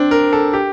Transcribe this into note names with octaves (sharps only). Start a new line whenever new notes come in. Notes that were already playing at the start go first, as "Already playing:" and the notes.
Already playing: C4 D4
A#4
A4
G4